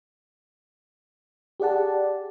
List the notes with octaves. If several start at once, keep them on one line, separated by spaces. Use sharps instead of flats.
G4 G#4 D5 F#5 A5